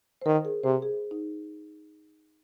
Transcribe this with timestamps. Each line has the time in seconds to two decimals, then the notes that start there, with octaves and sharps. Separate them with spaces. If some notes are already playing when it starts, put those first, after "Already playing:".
0.21 C5
0.26 D#3 A#4
0.45 G#4
0.63 C3 C5
0.82 G#4
1.11 D#4